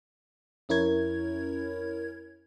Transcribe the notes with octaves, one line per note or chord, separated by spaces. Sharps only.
F2 C#4 E4 A#4 C#5 G#6